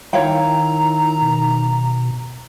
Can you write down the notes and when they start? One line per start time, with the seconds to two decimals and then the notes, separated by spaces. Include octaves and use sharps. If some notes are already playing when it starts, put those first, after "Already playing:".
0.13 D#3 E4 C#5 F5 G5 A#5
1.22 B2